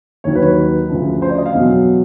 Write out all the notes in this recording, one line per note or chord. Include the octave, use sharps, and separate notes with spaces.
D#2 D#3 F#3 C#5
B4
B4
D2 C#3 F3
C5
D5
D#5
F5
E2 B2 F#3